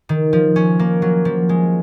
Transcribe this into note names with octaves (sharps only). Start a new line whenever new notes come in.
D#3
F3
C#4
A#3
F#3
F3
G#3